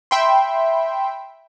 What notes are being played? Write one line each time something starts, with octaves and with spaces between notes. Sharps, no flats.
E5 G5 B5 C6